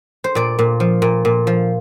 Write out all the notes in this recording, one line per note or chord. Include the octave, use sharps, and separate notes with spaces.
C5
A#2 D5
A#2
F3
A#2
A#2
F3